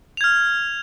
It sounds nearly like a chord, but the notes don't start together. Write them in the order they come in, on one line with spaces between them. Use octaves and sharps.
F7 G#6 F6